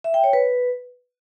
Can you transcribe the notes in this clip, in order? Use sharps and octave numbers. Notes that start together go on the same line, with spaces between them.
E5
G5
C#5
B4